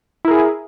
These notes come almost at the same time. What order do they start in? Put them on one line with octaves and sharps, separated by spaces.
E4 A#4 G#4